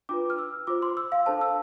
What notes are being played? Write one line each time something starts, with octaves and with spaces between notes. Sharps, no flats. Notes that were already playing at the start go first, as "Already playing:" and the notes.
D4 F4 B4 D6
F6
E6
F4 C5 D6
C6
E6
F5
D4 A4 C5 A5
E6